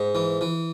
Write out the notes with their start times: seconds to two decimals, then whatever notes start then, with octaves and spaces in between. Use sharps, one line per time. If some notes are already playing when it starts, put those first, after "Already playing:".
Already playing: G#2
0.15 E3
0.41 E3